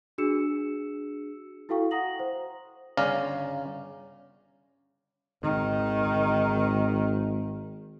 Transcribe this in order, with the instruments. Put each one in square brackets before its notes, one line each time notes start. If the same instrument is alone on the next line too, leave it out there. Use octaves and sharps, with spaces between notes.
[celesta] D4 F#4 G#4 E6 C#7 E7
E4 F#4 A4 F5 G5 C#6
F#5 A#5 D#6 A#6 F#7
C5
[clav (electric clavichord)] G1 C#3 C#4 D5 F5 A#5
[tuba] G#1 [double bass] D#3